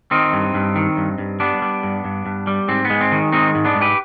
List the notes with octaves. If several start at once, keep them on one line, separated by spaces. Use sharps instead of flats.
D#3 C4 D#4
G2
G2
D#3
G2
G2
G3 B3 D4
G3
G2
G2
G2
G3
G#2 C4
B3
G#3
C4
D#3
G#3 C4 D#4
G#2
B3 D4
G#2
G4 B4